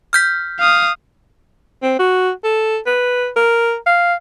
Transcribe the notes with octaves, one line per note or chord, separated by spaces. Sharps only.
F6 G6 B6
F5 D#6
C4
F#4
A4
B4
A#4
F5